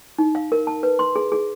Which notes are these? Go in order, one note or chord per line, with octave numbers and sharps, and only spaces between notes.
D#4
F5
A#4
A5
B4
C6
G#4
G#4